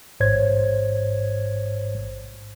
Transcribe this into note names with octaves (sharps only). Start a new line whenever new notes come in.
A1 G#2 C5 C#5 G#6